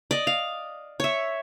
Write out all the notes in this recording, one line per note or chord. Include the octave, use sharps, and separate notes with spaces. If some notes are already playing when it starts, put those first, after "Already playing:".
D5 D#5
F5
C#5 E5